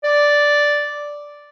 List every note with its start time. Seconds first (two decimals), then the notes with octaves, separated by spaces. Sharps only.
0.04 D5